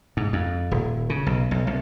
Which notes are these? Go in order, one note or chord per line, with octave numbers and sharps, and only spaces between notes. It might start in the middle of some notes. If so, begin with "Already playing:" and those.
G#2
F2
D#1
C#3
B1
B1
C2